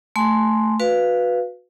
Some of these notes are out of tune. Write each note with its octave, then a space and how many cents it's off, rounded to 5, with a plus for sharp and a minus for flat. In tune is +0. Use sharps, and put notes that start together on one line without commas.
A3 +0 G#5 +0 C6 +0
F#4 -20 B4 +0 F5 -5